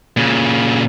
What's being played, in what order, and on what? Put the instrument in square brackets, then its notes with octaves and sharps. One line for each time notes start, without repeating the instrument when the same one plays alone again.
[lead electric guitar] A#2 C#3